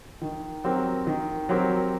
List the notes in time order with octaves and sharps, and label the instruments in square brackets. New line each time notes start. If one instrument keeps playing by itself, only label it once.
[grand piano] D#3
F#3 C4 G4 A#4
D#3
F#3 C4 G4 A#4